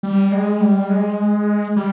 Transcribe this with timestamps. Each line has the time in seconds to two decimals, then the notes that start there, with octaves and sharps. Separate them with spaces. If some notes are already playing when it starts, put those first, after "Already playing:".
0.03 G3
0.32 G#3
0.61 G3
0.89 G#3
1.76 G3